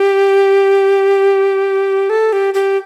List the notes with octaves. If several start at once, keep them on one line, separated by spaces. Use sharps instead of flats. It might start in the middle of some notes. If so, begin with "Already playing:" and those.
Already playing: G4
A4
G4
G4